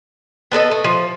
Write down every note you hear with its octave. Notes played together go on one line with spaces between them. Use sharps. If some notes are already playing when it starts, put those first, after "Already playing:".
B3 D4 A4 D#5
A3
F3